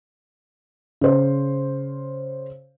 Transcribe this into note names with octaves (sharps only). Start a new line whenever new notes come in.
C#3 C5